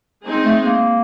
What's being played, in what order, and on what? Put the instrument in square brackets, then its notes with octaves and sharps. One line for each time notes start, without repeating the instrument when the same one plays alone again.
[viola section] G#3 C4 D#4 G#4
[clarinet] A3
A#3